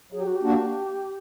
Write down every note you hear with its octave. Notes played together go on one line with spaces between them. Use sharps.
F#3 G#4
G4
F#4
G4
A#3 D4 F#4